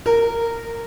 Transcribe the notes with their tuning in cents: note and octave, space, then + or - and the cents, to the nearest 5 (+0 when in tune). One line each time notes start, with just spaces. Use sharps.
A#4 -15